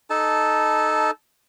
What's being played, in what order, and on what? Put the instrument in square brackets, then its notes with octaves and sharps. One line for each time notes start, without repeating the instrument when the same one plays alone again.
[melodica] D#4 A4 A5